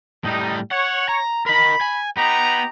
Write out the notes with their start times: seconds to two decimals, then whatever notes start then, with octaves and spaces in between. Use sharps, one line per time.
0.24 A2 G3 D#4
0.71 C#5 F#5
1.09 A#5
1.46 A#4 D#5 B5
1.81 G#5
2.17 B3 D#4 G4 A#5